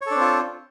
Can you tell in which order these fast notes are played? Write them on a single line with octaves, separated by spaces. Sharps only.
C#5 A4 D4 C4 F4